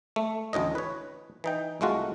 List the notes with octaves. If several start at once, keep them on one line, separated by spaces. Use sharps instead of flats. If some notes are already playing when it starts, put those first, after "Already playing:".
A3
A1 D2 A2 D#5
B4 C#5
E3 D#4 G5
C2 G#3 A3 F4 F#4